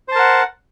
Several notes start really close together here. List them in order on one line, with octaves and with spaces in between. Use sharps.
C5 A5 A#4 F#5